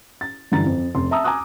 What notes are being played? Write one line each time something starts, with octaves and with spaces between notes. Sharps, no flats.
A6
G2 D3 E3 A#5 A6
F2
F1 C6
E5 A5 A#5 D#6 E6
G#5 A#5 D6 D#6 F#6